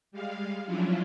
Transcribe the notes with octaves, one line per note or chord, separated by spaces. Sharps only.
G3 G#3 F5
F3 F#3 C#4 D4 E4 F4